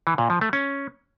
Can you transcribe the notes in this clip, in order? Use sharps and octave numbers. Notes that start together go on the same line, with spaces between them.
E3
A#2
F3
A3
C#4